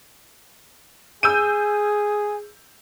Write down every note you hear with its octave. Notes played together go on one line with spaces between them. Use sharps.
G#4 G#5 E6 G6 D#7